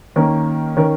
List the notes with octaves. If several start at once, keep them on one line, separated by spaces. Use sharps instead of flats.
D#3 A#3 C#4 A#4
D#3 C#4 A#4